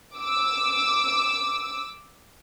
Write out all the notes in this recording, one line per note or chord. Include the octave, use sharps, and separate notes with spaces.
D6 E6